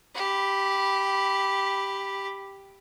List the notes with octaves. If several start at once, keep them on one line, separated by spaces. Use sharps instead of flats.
G4 B5